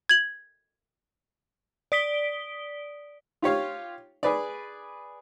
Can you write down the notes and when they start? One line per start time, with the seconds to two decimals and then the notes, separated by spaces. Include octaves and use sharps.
0.09 G#6 F#7
1.92 D5 D#6 B6 D7 G7
3.42 F4 G4 C#5 F5
4.23 G#4 B4 D5